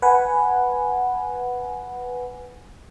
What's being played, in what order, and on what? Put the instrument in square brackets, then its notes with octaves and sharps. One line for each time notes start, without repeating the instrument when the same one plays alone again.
[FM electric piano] B4 F#5 G#5